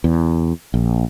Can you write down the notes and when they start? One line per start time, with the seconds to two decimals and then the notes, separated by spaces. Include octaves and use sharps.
0.04 E2
0.74 A#1